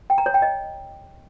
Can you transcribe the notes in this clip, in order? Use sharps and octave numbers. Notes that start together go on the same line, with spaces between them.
G5
A#5
C#5
G5
D#5